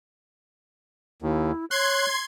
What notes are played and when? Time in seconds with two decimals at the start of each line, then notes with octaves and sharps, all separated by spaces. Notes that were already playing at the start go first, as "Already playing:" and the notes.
1.22 D#2 E4
1.71 C#5 C6 F#6 G#6